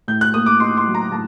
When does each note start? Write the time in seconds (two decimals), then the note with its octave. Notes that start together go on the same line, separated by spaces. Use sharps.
0.08 A2 G6
0.21 F#6
0.34 A#3 D#6
0.46 D6
0.60 D#4 C6
0.77 C6
0.87 F#3
0.95 A#5
1.11 A2 A5